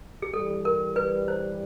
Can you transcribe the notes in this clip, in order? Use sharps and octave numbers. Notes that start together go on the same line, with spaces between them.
G#4
G2 E3 G3 A4
A#4
B4
C5